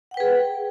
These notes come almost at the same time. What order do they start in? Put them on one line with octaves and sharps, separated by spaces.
F#5 G5 B4 G#4